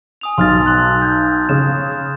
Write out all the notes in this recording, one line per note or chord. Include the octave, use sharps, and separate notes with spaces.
G#5 D#6 F7
B1 C6 F6 A6
C6 F#6
G6 G#6
C#3 E7